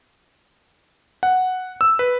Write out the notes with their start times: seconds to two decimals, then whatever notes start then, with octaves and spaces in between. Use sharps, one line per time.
1.23 F#5
1.81 E6
1.99 B4